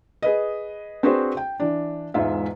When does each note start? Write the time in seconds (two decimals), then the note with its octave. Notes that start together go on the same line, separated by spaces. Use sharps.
0.22 G#4 B4 D#5
1.03 C4 D4 F#4 G#4 B4 C5
1.37 G5
1.60 E3 D4
2.14 E1 G#2 F4 E5